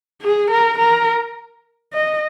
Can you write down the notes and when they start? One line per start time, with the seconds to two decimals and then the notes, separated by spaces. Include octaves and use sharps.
0.22 G#4
0.51 A#4
0.79 A#4
1.93 D#5